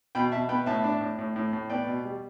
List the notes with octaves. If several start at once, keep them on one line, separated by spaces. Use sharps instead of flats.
B2 G5 B5
B2 E5 A5
B3 G5 B5
A2 E5 A5
D4
A2
A2
A2
A2
B3 D5 G5
B2
G3